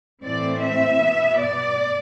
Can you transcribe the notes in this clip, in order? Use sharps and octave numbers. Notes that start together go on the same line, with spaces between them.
A2 E3 A3 C4 D5
E5
B2 B3
D5